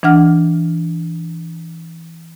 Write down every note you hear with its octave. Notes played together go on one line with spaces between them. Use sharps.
E3 D4 F#5 F6